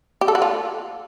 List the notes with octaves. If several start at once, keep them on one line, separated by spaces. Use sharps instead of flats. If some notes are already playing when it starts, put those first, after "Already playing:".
G4
A4
F#4
F4